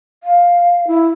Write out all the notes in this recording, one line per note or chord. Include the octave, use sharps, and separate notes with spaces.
F5
E4